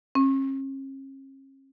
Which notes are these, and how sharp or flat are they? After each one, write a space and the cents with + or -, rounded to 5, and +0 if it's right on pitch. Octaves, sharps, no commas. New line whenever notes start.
C#4 -45